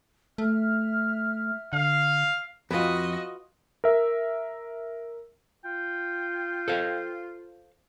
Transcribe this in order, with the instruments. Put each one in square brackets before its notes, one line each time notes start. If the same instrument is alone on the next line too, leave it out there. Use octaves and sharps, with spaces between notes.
[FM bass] A3 [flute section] E5 F6
[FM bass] D3 [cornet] F5
[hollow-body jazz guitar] F2 [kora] F4 B4 [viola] F#4 D#5
[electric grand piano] A#4 E5
[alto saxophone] F4 [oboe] G5
[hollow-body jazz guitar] A4 C5 F5